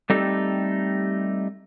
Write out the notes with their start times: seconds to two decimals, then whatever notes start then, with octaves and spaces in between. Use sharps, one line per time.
0.10 G3 A3 C4 D#4 G4 A4